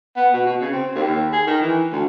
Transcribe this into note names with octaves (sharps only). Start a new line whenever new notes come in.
B3
B2
B2
C#3
C4
D#2
G#4
D#3
E3
D2